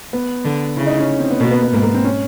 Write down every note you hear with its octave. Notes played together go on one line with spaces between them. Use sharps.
B3
D3
C#3 E4
D#4
C#4
C4
B3
B2 A#3
B3
B3
G#2 A#3
A#3
C4
C#4